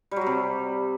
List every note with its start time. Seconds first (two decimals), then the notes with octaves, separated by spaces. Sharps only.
0.11 G3
0.16 F#3
0.21 G3
0.26 C3